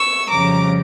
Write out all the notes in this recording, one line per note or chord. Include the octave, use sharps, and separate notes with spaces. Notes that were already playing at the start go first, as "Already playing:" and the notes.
Already playing: C#6 E6
F2 C#3 G3 A#5 D6